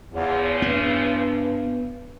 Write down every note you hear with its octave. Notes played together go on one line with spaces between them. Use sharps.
E2 C#3 E3 F3
G2 B3